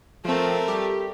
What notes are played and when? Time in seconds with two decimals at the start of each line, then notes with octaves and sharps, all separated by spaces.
0.25 F3 A3 C4 A#4
0.68 G3 G4